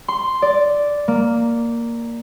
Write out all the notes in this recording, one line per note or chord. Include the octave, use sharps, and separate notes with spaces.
C6
D5
A#3